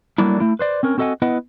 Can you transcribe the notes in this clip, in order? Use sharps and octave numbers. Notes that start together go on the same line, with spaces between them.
F#3 G3 A3 A#3 D4 E4
A3 E4
B4 C5 D5
C4 C#4 A#4
C4 F#4 A4 D#5 F#5 G#5
B3 E4 B4 D#5 F#5